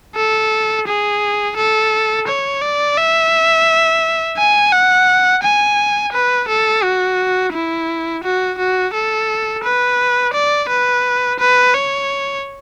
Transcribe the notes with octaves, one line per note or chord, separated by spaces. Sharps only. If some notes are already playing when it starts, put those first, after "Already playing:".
A4
G#4
A4
C#5
D5
E5
G#5
F#5
G#5
B4
A4
F#4
E4
F#4
F#4
A4
B4
D5
B4
B4
C#5